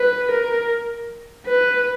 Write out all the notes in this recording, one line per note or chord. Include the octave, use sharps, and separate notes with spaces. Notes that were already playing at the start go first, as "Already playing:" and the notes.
Already playing: B4
A#4
B4